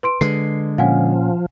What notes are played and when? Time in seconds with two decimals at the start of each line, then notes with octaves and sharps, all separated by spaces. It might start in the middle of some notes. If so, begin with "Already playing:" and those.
0.03 B4 C6 D7
0.21 D3 G#3 B4 C7
0.78 A#2 F3 C#4 F5 F#5 G#5